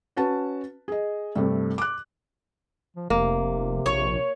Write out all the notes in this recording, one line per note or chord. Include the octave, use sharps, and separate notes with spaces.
C#4 F#4 B4 A5
G#4 D#5
G2 C3 A3
D6 F#6
F3
F1 C3 A#3
A#1 C#5